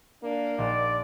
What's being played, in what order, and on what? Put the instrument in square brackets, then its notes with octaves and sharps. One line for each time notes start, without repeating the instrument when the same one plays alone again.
[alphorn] A#3 [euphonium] D4
[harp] A#1 E6 D7 [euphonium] D#4 [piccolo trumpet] D5